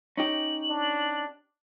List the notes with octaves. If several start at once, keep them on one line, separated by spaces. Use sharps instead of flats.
C#4 D#4 G4 F#7
D4